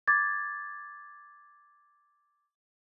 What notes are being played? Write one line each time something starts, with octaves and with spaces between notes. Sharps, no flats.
D6 G#6 A6